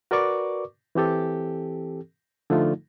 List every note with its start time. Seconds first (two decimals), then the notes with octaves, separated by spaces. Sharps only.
0.11 F#4 A#4 B4 D5 C#6 D6
0.95 E3 C4 G4 A4
2.50 D3 F3 A3 D#4 F4